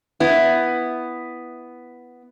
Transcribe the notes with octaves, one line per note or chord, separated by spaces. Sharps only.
B3 E4